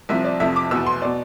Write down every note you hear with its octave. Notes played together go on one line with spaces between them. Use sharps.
C2 C3 F3 E5
D5
F2 C3 F3 E5
D6
E2 B2 E6
C6
B2 D5